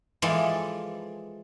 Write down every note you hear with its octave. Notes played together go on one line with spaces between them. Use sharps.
E3 F3 G#3 A4 D5